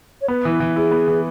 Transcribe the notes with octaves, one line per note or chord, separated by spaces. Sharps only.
C#5
B3 B4
E3
E3
E4 G#4
B3
E3